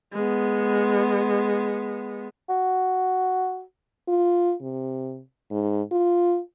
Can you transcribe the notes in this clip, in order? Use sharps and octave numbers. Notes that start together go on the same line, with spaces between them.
G#3 B3
F#4
F4
C3
G#2
F4